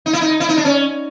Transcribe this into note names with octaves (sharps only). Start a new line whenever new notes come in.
D#4
E4
D#4
E4
D#4
D4
C#4